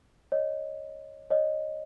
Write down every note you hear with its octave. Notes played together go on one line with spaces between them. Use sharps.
C#5 D#5
C#5 D#5